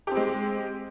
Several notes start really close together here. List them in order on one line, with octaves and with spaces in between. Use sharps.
G4 C4 G#3